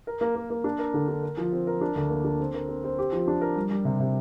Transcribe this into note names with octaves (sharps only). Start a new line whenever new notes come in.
A#4
A#3
A#3
A#3
D4
A#4
D3
D4
A#4
F3
C4
A#4
D4
D2
A#3
D4
C4
A#4
C4
C4
G4
F3
D4
A#4
G3
G3
C3
C3